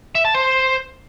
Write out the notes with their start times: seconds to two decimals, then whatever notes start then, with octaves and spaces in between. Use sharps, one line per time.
0.15 E5
0.25 A5
0.34 C5